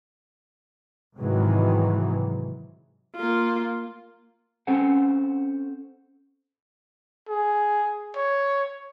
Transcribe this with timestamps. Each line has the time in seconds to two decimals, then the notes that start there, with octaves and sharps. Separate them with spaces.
1.18 G#2 C3 D#3 E3 F#3 G#3
3.16 A#3 F4
4.67 C4 C#4 A4 C5 F#5
7.29 G#4
8.16 C#5